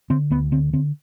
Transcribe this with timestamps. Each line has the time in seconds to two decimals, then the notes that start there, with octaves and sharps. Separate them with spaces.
0.10 D3 C4
0.30 D2 B3
0.52 D3 C4
0.73 D3 C4